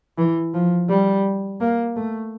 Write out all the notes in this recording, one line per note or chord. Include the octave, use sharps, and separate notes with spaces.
E3
F3
G3
A#3
A3